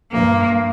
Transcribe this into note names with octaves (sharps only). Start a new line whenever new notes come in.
G2 A#3